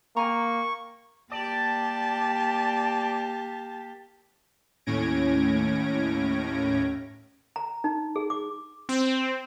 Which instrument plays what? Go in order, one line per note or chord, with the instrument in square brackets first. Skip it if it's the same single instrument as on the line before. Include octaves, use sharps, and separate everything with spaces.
[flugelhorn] A#3 [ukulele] G5 G#5 A#5 [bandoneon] C#6
[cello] A#3 G4 [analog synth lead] D5 [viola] A5
[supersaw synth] D#2 A2 C#4 G#6 A#6 D7
[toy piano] A#5
D#4
G#4
D6
[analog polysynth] C4